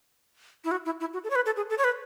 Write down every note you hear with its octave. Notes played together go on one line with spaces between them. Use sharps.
E4
F#4
E4
E4
F#4
A4
C#5
B4
A4
G#4
A4
C#5
B4